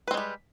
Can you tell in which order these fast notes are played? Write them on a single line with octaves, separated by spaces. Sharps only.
B4 C4 G#3 G3